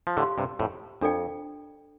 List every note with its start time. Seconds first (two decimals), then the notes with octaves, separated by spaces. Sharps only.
0.07 F3
0.17 A2 D3 G4 F5 C6
0.38 G2 C3
0.59 F2 A2
1.01 F2 D4 A4 D5 G5